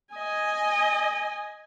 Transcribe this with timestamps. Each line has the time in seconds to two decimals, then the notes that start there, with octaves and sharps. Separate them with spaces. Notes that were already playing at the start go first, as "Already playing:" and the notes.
0.14 D#5 G#5